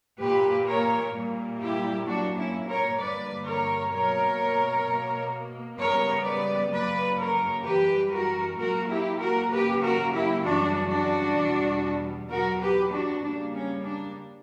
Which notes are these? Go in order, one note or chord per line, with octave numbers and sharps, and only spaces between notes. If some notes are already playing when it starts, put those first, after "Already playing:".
A#2 A#3 G4 B4
A#4 C#5
A#2 G3 A#3
E4 G4
A#2 F#3 A#3 D4 F#4
C#4 E4
A#4 C#5
G2 D3 G3 A#3 B4 D5
A#4 C#5
B2 F#3 A#3 A#4 C#5
B2 A#3
C#3 G3 B3 A#4 C#5
B4 D5
F#2 C#3 F#3 A#3 B4 D5
A#4 C#5
F#2 E3 G3 G4 B4
F#4 A#4
A#2 F#3 A#3 F#4 A#4
E4 G4
F#4 A#4
C#3 F#3 A#3 G4 B4
F#4 A#4
E4 G4
F#2 C#3 E3 G3 D4 F#4
D4 F#4
E2 B2 G3
E2 B2 F#3 B3 F#4 A#4
G4 B4
D4 F#4
C#3 G3 A#3 D4
C#4
D4